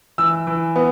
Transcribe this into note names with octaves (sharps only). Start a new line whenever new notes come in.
E3 E6
E3
B3